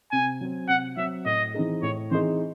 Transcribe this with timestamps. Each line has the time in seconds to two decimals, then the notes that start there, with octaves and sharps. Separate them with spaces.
0.12 C3 G#5
0.41 F#3 C4
0.69 C3 F#5
0.97 F#3 C4 E5
1.26 A2 D#5
1.54 E3 C4 D#4 G#4
1.82 A2 C#5
2.11 E3 C4 D#4 G#4 C5